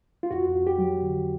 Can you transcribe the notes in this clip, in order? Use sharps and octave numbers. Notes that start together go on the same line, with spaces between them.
F4
F2 F#4
F2
G4
F#3
D3